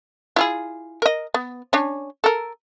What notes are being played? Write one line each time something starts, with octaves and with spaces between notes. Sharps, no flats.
E4 F4 G#4
A#4 D#5
B3
C#4 D4
A4 A#4